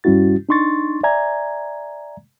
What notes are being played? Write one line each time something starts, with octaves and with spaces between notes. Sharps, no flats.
G2 G3 C#4 E4 F#4 A6
D4 D#4 C6 C#6 A6
D5 E5 G#5 A#5 G#6